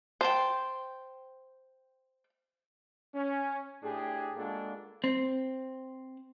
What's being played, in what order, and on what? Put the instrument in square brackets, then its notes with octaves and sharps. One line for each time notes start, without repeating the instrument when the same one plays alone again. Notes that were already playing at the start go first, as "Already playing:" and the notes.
[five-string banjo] C5 [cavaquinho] G5 A5 C6
[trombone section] C#4
A2 D4 G4 G#4
G#3 A#3 D4 F4 F#4 A4
[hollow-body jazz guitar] C4